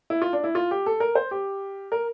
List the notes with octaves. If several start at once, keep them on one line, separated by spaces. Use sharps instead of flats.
E4
F4
D4
E4
F4
G4
A4
A#4
C5
G4
A#4